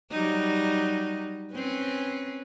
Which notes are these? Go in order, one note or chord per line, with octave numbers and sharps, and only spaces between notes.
F#3 G3 D#4
C4 C#4 B4